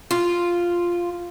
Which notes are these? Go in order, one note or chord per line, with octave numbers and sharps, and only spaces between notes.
F4